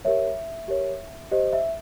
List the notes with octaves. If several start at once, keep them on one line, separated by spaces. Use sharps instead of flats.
G4 A#4 C#5 E5
G4 A#4 C#5
G4 C5 D#5
E5